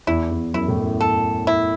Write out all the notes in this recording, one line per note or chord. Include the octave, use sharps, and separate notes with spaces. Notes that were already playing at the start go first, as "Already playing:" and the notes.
E2 E4
E2
F#2 E4
A2
F#2
A4
E4